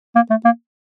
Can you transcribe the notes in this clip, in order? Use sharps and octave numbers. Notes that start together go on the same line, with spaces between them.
A#3
A3
A#3